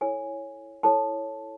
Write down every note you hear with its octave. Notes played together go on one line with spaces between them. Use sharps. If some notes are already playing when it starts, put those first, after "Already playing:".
E4 A4 C#5 G#5
E4 A4 C#5 A5